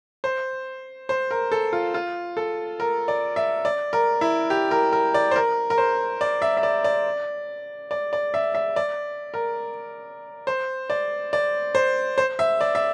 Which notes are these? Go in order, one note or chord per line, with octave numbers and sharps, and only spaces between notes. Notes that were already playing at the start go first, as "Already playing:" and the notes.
C5
C5
A#4
A4
F4
F4
A4
A#4
D5
E5
D5
A#4
E4
G4
A#4
A#4
D5
C5
A#4
A#4
C5
D5
E5
E5
D5
D5
D5
D5
E5
E5
D5
A#4
C5
D5
D5
C5
C5
E5
D5
E5